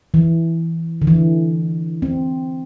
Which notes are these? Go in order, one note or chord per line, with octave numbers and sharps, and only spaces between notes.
E3
D3
E3
C4